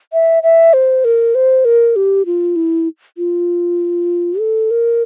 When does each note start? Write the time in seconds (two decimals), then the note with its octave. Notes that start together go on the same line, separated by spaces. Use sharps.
0.13 E5
0.43 E5
0.73 C5
1.05 A#4
1.35 C5
1.65 A#4
1.96 G4
2.26 F4
2.56 E4
3.18 F4
4.40 A4
4.71 A#4